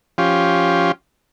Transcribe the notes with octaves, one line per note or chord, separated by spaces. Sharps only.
F3 C#4 F4 G4